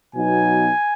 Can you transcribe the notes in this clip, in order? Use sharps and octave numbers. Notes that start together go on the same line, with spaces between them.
B2 F#3 B3 D#4 G#5